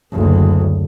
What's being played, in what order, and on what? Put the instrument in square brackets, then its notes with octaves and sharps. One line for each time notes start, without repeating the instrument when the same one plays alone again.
[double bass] F#1 D2